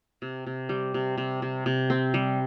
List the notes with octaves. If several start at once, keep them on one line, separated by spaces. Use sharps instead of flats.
C3
C3
G3
C3
C3
C3
C3
C4
G3